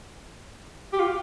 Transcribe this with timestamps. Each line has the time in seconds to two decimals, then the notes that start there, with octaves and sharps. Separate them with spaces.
0.93 G4
1.00 F4